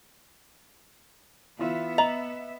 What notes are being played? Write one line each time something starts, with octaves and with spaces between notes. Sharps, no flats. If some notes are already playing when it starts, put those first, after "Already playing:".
E3 B3 F4 E5
D#5 A#5 F#7